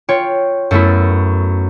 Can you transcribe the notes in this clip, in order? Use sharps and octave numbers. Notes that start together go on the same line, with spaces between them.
F4 C#5 G5
F#2 A3 B3 E4